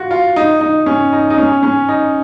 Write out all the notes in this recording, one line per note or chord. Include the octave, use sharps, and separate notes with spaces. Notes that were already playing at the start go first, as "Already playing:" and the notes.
Already playing: F4 F#4
F4
D#4
D#4
C#4
D#4
D#4
C#4
C#4
D#4